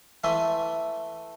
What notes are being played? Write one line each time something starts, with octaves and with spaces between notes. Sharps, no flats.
E3 A3 E5 G#5 C6